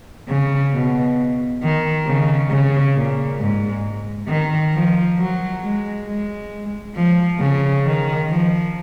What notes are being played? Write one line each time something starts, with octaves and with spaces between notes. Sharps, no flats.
C#3
B2
D#3
C#3
C#3
A#2
G#2
D#3
F3
F#3
G#3
G#3
F3
C#3
D#3
F3